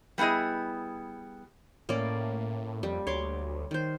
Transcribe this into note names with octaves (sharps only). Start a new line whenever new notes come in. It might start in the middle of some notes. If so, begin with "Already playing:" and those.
G3 B3 E4 G#4 D#5
A2 A#3 C#4 D5
F2 G3
D2 C#5 C6 D6
D#3 C5